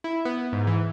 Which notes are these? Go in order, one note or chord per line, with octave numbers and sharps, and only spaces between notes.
E4
B3
G#2
E3